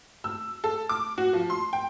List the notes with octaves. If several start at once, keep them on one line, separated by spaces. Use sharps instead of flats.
E6
A4
D6
F#4
F3
C6
G5